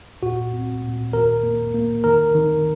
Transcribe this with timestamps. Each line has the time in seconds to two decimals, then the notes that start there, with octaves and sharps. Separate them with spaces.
0.23 A#2 F#4
0.53 C4
0.84 A#2
1.13 D#3 A#4
1.43 A#3
1.74 A#3
2.04 D#3 A#4
2.35 D#3